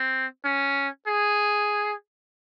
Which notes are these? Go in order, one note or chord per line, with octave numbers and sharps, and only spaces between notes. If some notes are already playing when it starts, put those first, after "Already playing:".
Already playing: C4
C#4
G#4